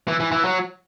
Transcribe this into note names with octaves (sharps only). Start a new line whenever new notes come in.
E3
E3
E3
F#3